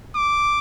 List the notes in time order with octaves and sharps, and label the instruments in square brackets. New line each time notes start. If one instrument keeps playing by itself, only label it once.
[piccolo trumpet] D6